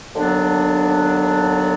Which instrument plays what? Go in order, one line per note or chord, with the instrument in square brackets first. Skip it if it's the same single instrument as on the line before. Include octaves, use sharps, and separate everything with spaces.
[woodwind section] D#2 D3 F#3 B3 D4